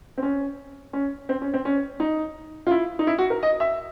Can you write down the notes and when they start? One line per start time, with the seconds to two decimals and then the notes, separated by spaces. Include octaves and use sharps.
0.18 C4
0.23 C#4
0.93 C#4
1.29 C4
1.42 C#4
1.54 C4
1.65 C#4
2.00 D#4
2.67 F4
2.71 E4
2.99 D#4
3.07 E4
3.19 F#4
3.30 A#4
3.43 D#5
3.60 E5